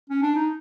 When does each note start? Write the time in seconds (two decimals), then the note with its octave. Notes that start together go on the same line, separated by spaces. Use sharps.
0.10 C#4
0.23 D4
0.36 D#4